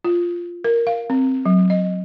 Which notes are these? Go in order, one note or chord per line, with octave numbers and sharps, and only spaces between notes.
F4
A#4
F5
C4
F#3
D#5